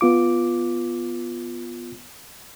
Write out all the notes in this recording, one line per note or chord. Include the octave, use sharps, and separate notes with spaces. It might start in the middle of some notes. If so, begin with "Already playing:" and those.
B3 F4 D6